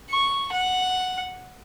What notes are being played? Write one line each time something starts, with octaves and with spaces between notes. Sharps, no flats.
C#6
F#5